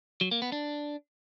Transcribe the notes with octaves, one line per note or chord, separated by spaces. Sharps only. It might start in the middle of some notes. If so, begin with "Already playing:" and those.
F#3
A#3
B3
D4